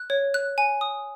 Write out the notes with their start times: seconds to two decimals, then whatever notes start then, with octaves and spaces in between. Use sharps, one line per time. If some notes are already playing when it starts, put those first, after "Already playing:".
Already playing: F#6
0.10 C#5
0.34 F#6
0.58 G#5
0.81 D#6